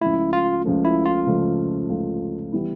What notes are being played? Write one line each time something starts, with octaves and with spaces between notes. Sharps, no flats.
C#2 C#3 F3 A3 E4
F4
C#2 C#3 F3 A3
E4
F4
C#2 C#3 F3 A3
C#2 C#3 F3 A3
E3 G3 B3 E4